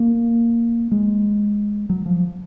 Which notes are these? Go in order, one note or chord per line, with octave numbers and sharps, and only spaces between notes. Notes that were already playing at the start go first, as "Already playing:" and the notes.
Already playing: A#3
G#3
F#3
F3